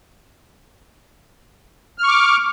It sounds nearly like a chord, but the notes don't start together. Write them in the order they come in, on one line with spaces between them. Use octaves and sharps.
F6 C#6 D6